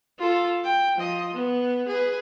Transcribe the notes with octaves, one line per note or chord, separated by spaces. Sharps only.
F4 A4
G5
F3 D#5
B3
G#4 B4